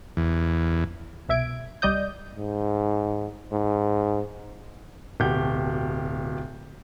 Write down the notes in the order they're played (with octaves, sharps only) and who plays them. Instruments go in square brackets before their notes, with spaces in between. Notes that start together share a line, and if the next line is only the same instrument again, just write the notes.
[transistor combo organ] E2
[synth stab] C2 B2 E5 G#6 D7
C2 G3 D5 D#5 D#6 G6
[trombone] G#2
G#2
[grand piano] D1 B2 G4 F#5 G6